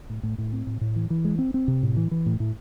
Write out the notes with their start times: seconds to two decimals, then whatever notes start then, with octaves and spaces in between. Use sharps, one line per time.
0.10 A2
0.23 A2
0.38 A2
0.53 C4
0.67 A2
0.81 A2
0.96 E3
1.10 E3
1.25 G#3
1.39 C4
1.54 C4
1.68 C3
1.83 A2
1.97 E3
2.11 E3
2.26 A2
2.40 A2